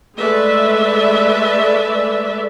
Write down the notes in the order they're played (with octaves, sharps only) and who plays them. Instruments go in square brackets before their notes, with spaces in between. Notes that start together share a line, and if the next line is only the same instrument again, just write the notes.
[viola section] G#3 A3 B4 D5 E5